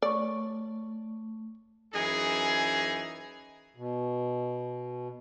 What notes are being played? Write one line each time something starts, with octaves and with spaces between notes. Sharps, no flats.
A3 C#5 D5 C#6
F#2 E3 D#4 G#4
B2